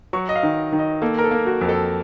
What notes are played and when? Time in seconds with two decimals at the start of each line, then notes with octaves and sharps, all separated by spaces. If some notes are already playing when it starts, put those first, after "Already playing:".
0.13 F#3 C#6
0.29 D#5
0.36 F5
0.43 D#3
0.72 D#3
0.79 D#5
1.02 A#3 A4
1.18 A#4
1.24 A4
1.31 A#3
1.46 F#4
1.61 F2
1.69 A4